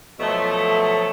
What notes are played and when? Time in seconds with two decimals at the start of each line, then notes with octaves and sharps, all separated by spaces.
0.20 B2 F3 F#3 A3